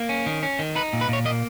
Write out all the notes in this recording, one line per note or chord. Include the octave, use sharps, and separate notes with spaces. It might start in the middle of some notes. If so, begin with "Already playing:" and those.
Already playing: A#3
C#4
D#3
C#4
D#3
D#4 B4
A#2
B4
A#2 C#5
A#3 D#5